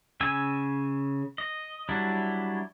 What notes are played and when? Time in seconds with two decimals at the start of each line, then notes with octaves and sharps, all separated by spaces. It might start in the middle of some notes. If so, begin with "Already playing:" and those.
0.21 C#3 G#5 E6
1.38 D#5
1.89 F#3 G3 D4 E4